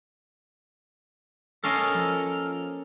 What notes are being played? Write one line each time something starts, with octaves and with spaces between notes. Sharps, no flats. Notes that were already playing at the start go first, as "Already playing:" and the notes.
A#3 C#4 A4 A#4 D#5 F5 F6
F3